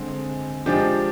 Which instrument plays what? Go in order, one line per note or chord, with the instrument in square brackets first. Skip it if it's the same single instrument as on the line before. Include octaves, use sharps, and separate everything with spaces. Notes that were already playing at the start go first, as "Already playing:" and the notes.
Already playing: [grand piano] D3 G#3 C4
F3 G#3 D4 G4